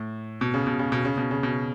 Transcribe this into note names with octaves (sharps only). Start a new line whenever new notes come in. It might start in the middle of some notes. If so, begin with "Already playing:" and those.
Already playing: A2
B2
C#3
B2
C#3
B2
C#3
B2
C#3
B2